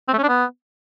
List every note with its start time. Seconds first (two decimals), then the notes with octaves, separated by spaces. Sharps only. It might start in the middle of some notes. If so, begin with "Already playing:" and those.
0.08 C4
0.13 A3
0.18 C#4
0.23 D4
0.28 B3